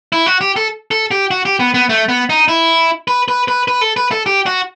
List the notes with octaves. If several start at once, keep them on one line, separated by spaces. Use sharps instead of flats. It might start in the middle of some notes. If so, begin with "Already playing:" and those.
E4
F#4
G4
A4
A4
G4
F#4
G4
B3
B3
A3
B3
D#4
E4
B4
B4
B4
B4
A4
B4
A4
G4
F#4